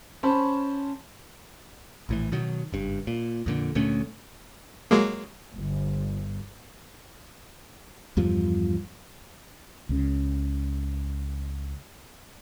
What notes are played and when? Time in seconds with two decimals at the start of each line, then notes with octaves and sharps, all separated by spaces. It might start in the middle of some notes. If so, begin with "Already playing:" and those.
0.23 C#4 C5 A5 B5
2.09 A#1 A2 E3
2.32 B2 D#3 F#3
2.72 F#1 G2
3.07 A#2
3.46 F2 A#2 D3
3.75 D2 A#2 A3 C#4
4.91 F#3 G#3 A#3
5.55 G1
8.17 E2 G2 F3
9.89 C#2 C#3